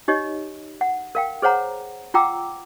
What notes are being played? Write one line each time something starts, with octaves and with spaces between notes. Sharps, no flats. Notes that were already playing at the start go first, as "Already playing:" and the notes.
D#4 G4 C#5 D#5
F#5
A#4 F5 G5
G#4 C5 C#5 F#5 A#5
F4 F#5 G5 A#5 D6 E6